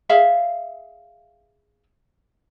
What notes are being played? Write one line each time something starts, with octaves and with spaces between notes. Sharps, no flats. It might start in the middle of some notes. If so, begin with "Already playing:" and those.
G#4 E5 F5